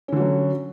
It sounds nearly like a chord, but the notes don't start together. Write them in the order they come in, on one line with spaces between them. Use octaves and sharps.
C#4 D3 F#4 F#3